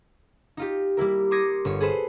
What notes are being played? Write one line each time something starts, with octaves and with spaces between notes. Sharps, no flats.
D#4 F4 G4
G3 A#3 E4 A#4
C6 D6 D#6 G#6 A#6 C#7
G1 C#5
G#4 A4 B4 C5